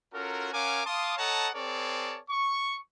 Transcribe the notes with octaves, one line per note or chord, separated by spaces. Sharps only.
C#4 F4 F#4 A4 A#4
C#4 A#4 F5 F#5 G#5 D6
F5 A5 C6 D6 D#6
A4 C#5 D#5 F#5 A5 A#5
C4 G#4 A#4 C#5 D5 A5
C#6